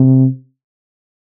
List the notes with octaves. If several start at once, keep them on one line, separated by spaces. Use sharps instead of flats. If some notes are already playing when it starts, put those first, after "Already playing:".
Already playing: C3